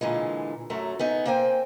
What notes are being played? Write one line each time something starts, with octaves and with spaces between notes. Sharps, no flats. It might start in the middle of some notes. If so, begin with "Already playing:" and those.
A#2 D3 E3 G#3
F#2 F#3 A3
B3 C#4 D#4
A#3 C4 C5 G5 G#5